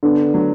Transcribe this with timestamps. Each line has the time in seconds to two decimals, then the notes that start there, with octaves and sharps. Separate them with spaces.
0.03 D3 B3
0.34 F#3